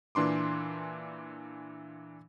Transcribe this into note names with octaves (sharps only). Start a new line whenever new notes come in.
A#2 E3 D4 C6 D6